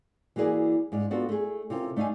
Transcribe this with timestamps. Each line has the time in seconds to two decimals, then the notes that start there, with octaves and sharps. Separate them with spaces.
0.36 E3 A#3 F#4 G#4 D5
0.92 G#2 D4 F5
1.11 B3 D4 F4 F#4 A4
1.29 A3 G#4
1.70 C3 C#4 F4 A4 A#4
1.96 A3 D4 D#4 F5 G#5